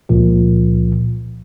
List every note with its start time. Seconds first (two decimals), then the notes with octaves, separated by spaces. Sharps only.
0.09 C#2 A#2 F3